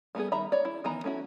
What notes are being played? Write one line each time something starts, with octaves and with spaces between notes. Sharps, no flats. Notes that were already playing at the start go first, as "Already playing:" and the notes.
G3 A3 B3 G#4
D#3 G3 E5 A#5 B5
C#5 D5
E4
D#3 E3 B3 A#5
A3 C#4 E4 F#4